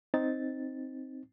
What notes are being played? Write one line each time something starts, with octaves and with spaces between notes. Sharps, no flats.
C4 D#4 A6